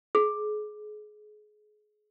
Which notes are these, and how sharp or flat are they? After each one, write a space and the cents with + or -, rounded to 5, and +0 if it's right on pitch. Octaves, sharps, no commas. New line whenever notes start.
G#4 +30